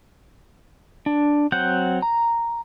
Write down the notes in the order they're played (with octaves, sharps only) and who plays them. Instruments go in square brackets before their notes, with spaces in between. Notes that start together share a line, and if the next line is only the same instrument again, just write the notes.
[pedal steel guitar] D4
F#3 C4 F#5 G6
A#5